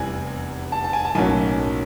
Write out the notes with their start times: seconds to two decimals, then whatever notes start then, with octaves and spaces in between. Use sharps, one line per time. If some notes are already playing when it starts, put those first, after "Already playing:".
Already playing: F1 E2 C3 E3 G3 G#5
0.72 A5
0.84 A5
0.93 G#5
1.05 A5
1.15 B1 A2 F#3 A#3 C#4 G#5